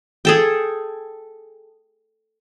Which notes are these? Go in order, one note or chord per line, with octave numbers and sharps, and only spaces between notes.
G#4 A4 G5